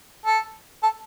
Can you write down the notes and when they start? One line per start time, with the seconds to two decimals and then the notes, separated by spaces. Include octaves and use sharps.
0.26 A4
0.83 A4